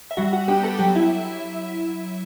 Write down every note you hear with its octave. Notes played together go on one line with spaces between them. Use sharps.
E5
G3 F#4 F#5
F#4 F#5
B3 D4 G4 G5
A4 A5
F#3 G4 G5
E4 E5